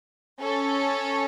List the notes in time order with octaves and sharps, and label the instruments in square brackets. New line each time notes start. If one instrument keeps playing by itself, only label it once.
[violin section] C#4 A4 C#5